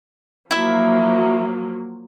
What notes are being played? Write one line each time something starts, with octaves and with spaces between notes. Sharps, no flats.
F3 F#3 A#3 E4 E5